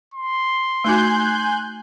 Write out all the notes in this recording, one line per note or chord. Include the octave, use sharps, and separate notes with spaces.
C6
A3 D#4 F#4 G#5 F#6 G6